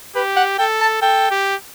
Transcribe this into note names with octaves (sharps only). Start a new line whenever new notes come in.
G4 B4
F#5
A4 G5
A5
A4 G5
G4